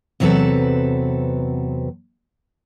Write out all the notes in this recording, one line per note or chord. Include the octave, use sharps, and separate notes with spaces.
E2 C3 F#3 C4 A4 B4